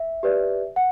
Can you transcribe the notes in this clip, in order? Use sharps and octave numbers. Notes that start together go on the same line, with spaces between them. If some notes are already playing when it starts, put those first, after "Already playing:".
Already playing: E5
G4 B4 D5
F#5